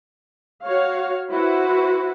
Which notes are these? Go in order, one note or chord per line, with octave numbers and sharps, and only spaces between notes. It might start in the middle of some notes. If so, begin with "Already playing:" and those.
F#4 C#5 F5
E4 F#4 B4 C5